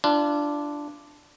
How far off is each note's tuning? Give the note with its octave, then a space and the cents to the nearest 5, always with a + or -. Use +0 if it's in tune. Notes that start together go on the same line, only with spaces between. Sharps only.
D4 +0 F4 -35